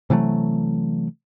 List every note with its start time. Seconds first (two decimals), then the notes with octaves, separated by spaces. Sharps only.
0.10 C3 E3 F#3 A3